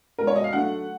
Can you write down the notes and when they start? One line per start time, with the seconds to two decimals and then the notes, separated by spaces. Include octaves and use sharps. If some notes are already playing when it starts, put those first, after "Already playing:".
0.18 B2 G#3 A#4
0.27 C#5
0.36 D#5
0.44 F5
0.53 D3 F#3 A3 F#5